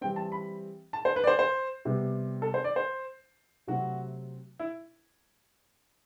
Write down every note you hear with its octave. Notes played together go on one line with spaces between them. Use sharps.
E3 G3 C4 G5
A5
B5
A5
C5
B4
D5
C5
C5
C3 G3 B3
A4
C5
D5
C5
C3 F#3 A3 C4 F#4
E4